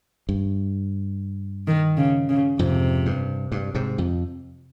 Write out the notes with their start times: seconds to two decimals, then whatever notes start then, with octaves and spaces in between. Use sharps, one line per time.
0.29 G2
1.67 D#3
1.97 C#3
2.29 C#3
2.59 F2 G#2 C3
3.06 G2
3.52 G2
3.75 G#2 C3
3.98 F2